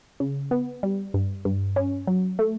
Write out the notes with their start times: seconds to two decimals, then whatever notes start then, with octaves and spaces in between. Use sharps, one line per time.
0.20 C#3
0.51 B3
0.83 G3
1.14 G2
1.45 G2
1.76 C#4
2.07 F#3
2.39 A3